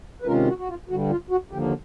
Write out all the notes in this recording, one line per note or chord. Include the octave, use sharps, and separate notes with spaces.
B4
C3 D#3 G#3 C#4 F4 A#4
F#4
F#4
F4
G2 D3 G3 F#4
F4
F#4
D#2 D3 F3 A#3 G4